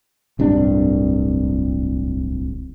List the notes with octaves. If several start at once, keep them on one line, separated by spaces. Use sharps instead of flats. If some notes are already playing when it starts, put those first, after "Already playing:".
D1 C2 G2 D4